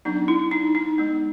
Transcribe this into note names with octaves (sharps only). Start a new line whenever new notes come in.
F#3 B3 D4 D#4
E4
D#4
D#4
G#3 B3 D#4